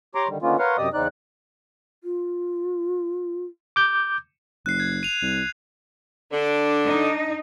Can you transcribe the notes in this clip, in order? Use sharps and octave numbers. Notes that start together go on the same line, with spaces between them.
G4 C#5 A#5 C6 D6
D3 D#3 G3
D3 D#3 A#3 B3 C#4 F4
A#4 B4 C#5 F5 F#5 C6
F#2 C3 G4 D5 D#5 D#6
E2 C#3 C4 D#4 D5 F#6
F4
D6 G6
F#1 F#6 C7
G#6
D#7 F7
C2
D3 D4 D6
D#4